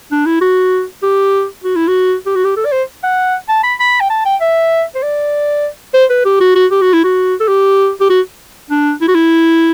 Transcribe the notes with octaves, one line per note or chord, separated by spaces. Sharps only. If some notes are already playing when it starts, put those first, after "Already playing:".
D4
E4
F#4
G4
F#4
E4
F#4
G4
F#4
G4
A4
D5
C5
F#5
A5
B5
B5
G5
A5
G5
E5
C5
D5
C5
B4
G4
F#4
F#4
G4
F#4
E4
F#4
A4
G4
G4
F#4
D4
E4
F#4
E4